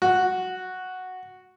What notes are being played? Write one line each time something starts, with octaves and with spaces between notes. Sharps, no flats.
F#4